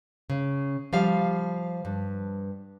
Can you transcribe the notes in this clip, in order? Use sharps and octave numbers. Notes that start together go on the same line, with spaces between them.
C#3
F3 G3 F5
G2